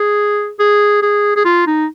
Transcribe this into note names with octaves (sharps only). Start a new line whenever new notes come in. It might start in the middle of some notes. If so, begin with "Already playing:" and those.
Already playing: G#4
G#4
G#4
G#4
F4
D#4